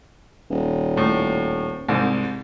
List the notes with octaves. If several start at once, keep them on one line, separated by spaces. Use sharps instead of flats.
D#1
A2
C2 G#2